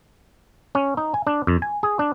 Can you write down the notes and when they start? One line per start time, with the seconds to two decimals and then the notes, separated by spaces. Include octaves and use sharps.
0.75 C#4
0.97 D#4
1.14 G#5
1.27 D4
1.47 F2
1.62 G#5
1.83 G#4
1.99 D4